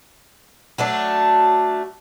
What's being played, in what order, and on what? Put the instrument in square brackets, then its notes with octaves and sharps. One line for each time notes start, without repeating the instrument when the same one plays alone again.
[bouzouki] F#3 A3 D4